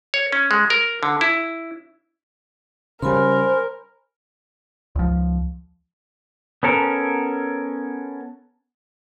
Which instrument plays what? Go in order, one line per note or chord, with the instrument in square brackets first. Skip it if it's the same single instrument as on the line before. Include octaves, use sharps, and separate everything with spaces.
[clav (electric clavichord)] C#5
C#4
G#3
A#4
D3
E4
[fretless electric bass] C#3 G3 [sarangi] A#4 [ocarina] C5 [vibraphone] G#5 B5 C6
[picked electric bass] C#2 F3
[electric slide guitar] B3 C#4 A4 A#4